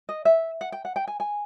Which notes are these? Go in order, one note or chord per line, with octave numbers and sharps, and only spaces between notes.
D#5
E5
F#5
G5
F#5
G5
G#5
G#5